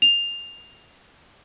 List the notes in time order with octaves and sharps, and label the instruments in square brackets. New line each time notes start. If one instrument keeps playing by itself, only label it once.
[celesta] F7